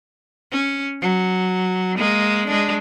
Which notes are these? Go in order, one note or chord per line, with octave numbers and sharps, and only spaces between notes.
C#4
F#3
G#3 A#3
G#3 D4